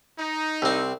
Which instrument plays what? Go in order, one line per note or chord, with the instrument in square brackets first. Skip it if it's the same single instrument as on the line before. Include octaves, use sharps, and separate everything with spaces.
[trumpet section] D#4
[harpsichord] C2 C4